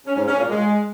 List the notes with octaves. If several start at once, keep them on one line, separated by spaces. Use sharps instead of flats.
C#4
G#2
C#4
A#2
G#3